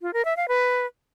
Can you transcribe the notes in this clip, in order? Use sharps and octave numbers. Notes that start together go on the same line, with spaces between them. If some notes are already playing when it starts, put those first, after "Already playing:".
F4
A#4
E5
F5
B4